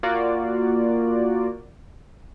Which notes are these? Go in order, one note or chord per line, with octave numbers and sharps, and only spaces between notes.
A#3 F4 F#4 D5